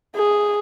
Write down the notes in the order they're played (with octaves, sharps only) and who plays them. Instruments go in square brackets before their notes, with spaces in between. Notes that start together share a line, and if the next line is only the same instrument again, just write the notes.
[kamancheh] G#4